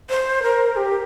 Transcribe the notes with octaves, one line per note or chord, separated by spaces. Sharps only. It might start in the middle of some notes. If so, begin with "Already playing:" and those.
C5
A#4
G4